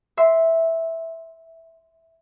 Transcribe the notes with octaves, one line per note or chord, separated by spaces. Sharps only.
E5 C6